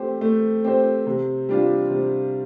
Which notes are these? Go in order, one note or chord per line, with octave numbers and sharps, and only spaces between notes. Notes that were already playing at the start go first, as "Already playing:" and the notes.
Already playing: A3 C4 G4 C5
A3
C4 G4 C5
C3
G3 D4 F4
C3